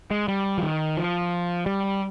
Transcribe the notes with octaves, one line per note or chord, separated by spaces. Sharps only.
G#3
G3
F3
D#3
F3
G3